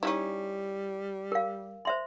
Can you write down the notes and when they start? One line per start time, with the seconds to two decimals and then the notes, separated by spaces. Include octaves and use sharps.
0.03 G3 C#4 D#4 E4
1.32 A#4 F5
1.85 C5 E5 C6